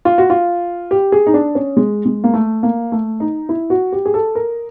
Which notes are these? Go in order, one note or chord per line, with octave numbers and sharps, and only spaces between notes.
F4
F#4
F4
G4
G#4
D#4
D4
C#4
G#3
G#3
A#3
A3
A#3
A3
D#4
E4
F#4
G4
G#4
A4
A#4